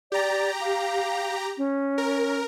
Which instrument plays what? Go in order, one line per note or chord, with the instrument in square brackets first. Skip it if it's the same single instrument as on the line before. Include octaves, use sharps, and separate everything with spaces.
[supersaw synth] G4 A#5 [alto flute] D5
[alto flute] F5
C#4
[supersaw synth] A#4